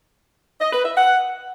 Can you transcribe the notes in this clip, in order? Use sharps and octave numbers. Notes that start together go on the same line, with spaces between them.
D#5
B4
E5
F#5